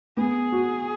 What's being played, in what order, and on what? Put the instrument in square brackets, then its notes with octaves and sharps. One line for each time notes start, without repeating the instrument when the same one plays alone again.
[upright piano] B3 [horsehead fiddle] G#4
[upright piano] F#4